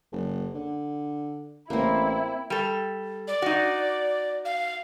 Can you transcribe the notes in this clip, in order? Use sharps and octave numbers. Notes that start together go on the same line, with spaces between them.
F#1
D3
A1 A#3 C4 E4
G3 A4
D5
D#4 F#4
F5